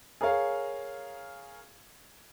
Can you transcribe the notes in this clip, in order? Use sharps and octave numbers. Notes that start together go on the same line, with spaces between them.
G#4 A#4 C#5 F5